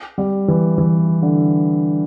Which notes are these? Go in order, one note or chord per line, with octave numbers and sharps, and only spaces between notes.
G3
E3
E3
D3